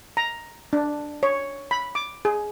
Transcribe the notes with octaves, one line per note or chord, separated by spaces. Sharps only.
A#5
D4
C#5
B5
D6
G#4